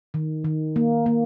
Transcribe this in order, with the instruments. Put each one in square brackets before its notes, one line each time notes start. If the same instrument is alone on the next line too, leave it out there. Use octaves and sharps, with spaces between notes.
[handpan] D#3
D#3
A#3
A#3